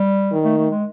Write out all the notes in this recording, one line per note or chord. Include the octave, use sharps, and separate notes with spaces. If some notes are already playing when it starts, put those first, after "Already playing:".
Already playing: G3
D#3
A3
A3
G#3